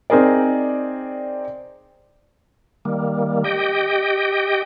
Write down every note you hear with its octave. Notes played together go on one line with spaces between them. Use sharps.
C4 D#4 G#4 A#4 D5
D#3 G3 A#3
G4 D#5 G5